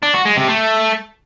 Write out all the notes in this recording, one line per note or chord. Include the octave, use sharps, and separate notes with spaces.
D4
F#4
G#3
C3
A3